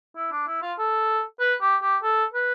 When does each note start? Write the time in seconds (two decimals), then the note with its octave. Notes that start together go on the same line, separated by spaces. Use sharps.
0.16 E4
0.32 D4
0.47 E4
0.62 F4
0.78 A4
1.40 B4
1.61 G4
1.82 G4
2.03 A4
2.33 B4